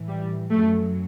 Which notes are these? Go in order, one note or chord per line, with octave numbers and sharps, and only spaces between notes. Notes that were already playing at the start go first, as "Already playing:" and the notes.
Already playing: A2 E3
G3
F#2 F#3 A3